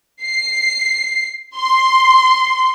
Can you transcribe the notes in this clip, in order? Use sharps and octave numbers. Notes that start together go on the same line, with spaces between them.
C7
C6